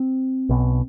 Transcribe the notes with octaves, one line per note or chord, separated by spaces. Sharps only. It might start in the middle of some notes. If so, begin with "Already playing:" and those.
Already playing: C4
B1 B2